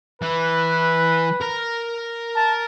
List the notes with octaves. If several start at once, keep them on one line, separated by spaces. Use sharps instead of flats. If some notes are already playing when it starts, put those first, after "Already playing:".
E3 B4
A#4 A#5
A5